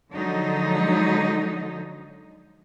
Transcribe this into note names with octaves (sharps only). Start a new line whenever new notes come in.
D3 F3 F#3 G#3 D#4